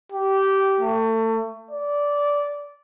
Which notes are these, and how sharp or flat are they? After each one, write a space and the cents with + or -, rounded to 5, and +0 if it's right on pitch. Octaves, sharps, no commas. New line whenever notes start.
G4 -15
A3 +30
D5 -15